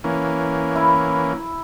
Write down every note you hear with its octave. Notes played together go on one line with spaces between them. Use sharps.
E3 A#3 C#4
E4